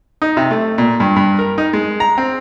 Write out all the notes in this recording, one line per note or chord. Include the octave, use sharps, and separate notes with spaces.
D#4
C3
A3
A#2
G2
G2
A#4
D#4
G#3
A#5
C4